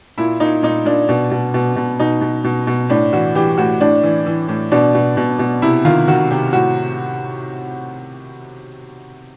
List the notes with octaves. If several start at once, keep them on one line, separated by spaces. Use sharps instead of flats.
A#2 E4
A#2 D#4
A#2 D#4
A#2 D4
B2
B2
B2
B2
B2 D#4
B2
B2
B2
A2 D4
E3 F#4
E3 G4
A2 F#4
A2 D4
E3
E3
A2
B2 D4
B2
B2
B2
C3 E4
D#3 F4
D#3 F#4
C3 G4
A2 F#4